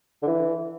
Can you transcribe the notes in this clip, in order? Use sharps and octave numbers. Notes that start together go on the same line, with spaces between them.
D3
E3